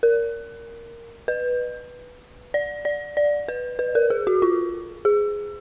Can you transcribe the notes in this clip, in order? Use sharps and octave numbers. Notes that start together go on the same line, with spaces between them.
A#4
B4
D5
D5
D5
B4
B4
A#4
G#4
F#4
F4
G#4